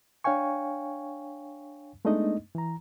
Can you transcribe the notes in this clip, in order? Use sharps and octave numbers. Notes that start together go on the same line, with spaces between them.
D4 C#5 F5 G5 G#5 C#6
G#3 A3 B3 D4 D#4 D#5
E3 A#5